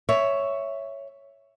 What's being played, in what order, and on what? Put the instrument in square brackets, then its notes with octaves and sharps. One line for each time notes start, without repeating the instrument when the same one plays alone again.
[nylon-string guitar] C#5 E5